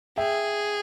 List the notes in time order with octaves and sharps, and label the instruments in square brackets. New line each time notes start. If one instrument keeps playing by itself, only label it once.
[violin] G#4 [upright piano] E5 G5